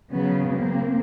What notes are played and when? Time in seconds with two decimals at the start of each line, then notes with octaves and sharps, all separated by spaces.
0.13 C#3 F#3 B3
0.53 A#3 C4